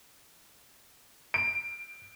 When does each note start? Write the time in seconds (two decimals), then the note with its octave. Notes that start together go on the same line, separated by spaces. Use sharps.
1.34 D7